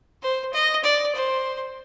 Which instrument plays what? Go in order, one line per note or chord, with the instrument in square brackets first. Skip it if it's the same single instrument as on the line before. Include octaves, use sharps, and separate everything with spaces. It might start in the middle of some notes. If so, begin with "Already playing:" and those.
[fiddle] C5
D#5
D5
C5